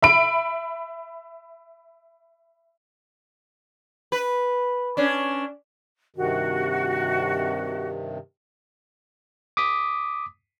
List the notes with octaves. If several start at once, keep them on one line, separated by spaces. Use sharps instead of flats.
E5 B5 D7
B4
C#4 D4
G2 C3 D#3 F#4
D6 D#6 B6